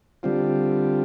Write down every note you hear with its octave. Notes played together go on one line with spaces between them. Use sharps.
D3 G3 C4 F4